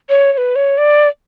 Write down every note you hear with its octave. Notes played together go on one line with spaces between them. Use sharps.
C#5
C#5
B4
C#5
D5